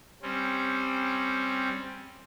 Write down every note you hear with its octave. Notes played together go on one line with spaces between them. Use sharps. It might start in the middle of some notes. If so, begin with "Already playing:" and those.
G3 C4 C#4